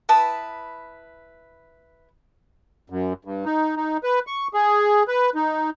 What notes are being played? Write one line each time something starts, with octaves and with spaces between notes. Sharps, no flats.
E4 B4 A5 D#6
F#2
G2
D#4
D#4
B4
C#6
G#4
B4
D#4